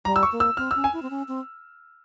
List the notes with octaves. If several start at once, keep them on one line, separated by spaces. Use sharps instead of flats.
G3 A#5
E6
C#6
A#3
E6
C4 F6
E6
C#4
G#5
E4
C4
C#4
C4